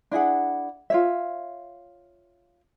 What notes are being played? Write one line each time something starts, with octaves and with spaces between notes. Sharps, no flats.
D4 E4 G#4 F#5
F4 C#5 E5